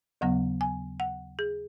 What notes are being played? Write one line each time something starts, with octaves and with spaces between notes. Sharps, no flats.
D#2 C#3 F#3 B3 F#5
G#5
F#5
G#4